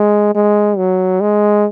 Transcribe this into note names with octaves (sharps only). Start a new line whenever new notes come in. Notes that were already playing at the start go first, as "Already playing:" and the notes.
Already playing: G#3
G#3
F#3
G#3